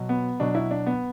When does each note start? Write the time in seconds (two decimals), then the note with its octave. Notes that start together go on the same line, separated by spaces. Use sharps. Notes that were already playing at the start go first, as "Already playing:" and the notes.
Already playing: B2 F#3
0.09 B3
0.40 B2 F#3 D4
0.55 E4
0.71 D4
0.86 B3